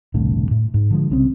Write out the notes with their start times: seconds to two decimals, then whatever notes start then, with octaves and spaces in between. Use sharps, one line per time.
0.14 E1 C2 A2 D3
0.51 A2
0.74 G#2
0.90 D3 F3 G#3
1.10 C2 C#3 C4